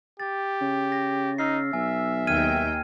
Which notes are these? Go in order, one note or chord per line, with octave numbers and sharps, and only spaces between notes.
G4 A6
C#3
A#6
D#4 E6 F6 C7
B1 E5 G#5
D#2 D#3 G5 F6 G#6 D#7